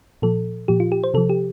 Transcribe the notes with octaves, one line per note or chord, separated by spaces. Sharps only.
A#2 F3 A4
A#2 F3 G4
F4
G4
C5
C3 F3 A4
G4